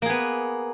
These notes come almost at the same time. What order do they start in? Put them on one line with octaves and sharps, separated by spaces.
A#3 G#4 B3